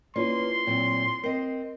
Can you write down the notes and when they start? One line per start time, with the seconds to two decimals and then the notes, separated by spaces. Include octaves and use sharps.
0.16 A#3 C#4 E4 F4 B4 D5 C6
0.67 A#2 F#3 C4
1.24 C4 A#4 D#5 C7